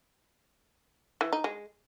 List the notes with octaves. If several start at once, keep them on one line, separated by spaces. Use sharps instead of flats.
E3
D#4
G#3